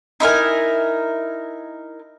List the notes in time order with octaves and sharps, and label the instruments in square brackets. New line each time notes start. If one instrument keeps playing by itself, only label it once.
[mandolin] D#4 E4 A#4 G#5